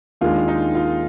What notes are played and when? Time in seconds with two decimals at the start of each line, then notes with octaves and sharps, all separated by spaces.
0.21 D#2 D#3 G#3 D4 F4
0.48 D#4
0.75 F4